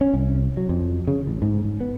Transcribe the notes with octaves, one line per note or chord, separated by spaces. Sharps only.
C#4
C2
F#3
F2
C#3
A1
G#2
G#2
B3